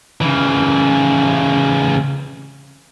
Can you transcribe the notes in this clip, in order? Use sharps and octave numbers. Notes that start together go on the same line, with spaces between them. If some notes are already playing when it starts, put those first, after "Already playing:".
C#3 E3